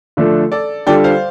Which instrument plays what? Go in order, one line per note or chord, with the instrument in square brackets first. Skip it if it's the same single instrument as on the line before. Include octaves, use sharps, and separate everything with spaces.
[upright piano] D3 F3 A3 D4 A4
[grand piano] A4 D5
[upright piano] D3 G3 F4 A4 [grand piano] D5 G5
[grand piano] C5 F5